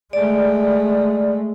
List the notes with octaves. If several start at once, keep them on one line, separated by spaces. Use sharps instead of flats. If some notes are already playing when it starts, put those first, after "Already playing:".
G#3 A3 D5